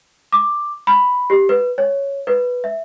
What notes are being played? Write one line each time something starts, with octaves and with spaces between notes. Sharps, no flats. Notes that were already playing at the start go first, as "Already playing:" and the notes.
D6
B5
G4
B4
C#5
B4
E5